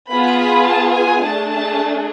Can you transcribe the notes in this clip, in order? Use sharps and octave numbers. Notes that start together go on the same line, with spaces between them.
B3 F4 G#4 B5
B5
A5
G#5
A3 D4 G#4 A5
A5